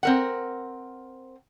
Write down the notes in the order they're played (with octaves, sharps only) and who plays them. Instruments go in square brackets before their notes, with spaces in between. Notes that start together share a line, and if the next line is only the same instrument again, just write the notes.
[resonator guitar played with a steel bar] C4 A#4 F#5